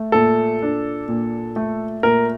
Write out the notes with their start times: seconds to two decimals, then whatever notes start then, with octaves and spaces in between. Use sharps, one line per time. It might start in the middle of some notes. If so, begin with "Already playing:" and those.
Already playing: A3
0.12 A#2 A4
0.62 D4
1.08 A#2
1.56 A3
2.03 A#2 A#4